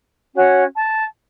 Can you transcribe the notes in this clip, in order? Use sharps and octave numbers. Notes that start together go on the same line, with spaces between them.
C#4 F#4 C#5
A5